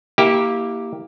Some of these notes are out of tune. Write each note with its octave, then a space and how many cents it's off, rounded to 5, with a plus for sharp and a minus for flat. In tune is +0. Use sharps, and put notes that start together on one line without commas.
A#3 +0 E4 -25 G4 +0